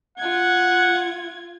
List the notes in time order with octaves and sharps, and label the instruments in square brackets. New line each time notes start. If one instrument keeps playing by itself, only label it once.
[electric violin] F4 G#6 [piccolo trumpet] F#5